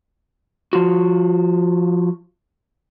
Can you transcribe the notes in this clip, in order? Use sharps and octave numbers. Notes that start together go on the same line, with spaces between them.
F3 F4 F#4